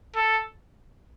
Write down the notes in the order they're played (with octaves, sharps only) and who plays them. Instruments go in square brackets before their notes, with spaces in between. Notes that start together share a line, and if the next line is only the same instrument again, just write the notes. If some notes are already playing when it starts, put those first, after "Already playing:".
[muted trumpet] A4